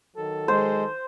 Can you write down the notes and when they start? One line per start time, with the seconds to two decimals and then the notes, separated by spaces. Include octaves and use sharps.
0.16 D#3 F#3 A4
0.48 G#3 C5